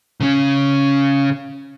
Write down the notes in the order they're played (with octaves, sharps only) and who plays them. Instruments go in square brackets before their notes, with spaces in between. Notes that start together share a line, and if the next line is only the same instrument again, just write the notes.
[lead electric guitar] C#3 C#4